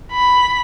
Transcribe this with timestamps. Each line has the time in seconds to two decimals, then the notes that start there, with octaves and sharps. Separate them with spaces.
0.12 B5